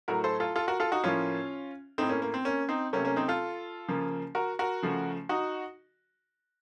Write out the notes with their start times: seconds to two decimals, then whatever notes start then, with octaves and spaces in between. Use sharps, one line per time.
0.08 A2 F#3 A3 F#4 A#4
0.24 A4 C5
0.40 F4 A4
0.56 F4 A4
0.68 F#4 A#4
0.80 F4 A4
0.92 D#4 F#4
1.04 A2 F3 A#3 C#4 F4
1.98 A2 A3 C4 D#4
2.09 A#3 C#4
2.22 A#3
2.34 C4
2.45 A#3 C#4
2.69 C4 D#4
2.93 C3 F#3 A3 A#3 C#4
3.05 A#3 C#4
3.16 C4 D#4
3.28 F4 A4
3.88 C#3 F3 A#3
4.35 F#4 A#4
4.59 F#4 A#4
4.83 C#3 F3 A3
5.29 D#4 F#4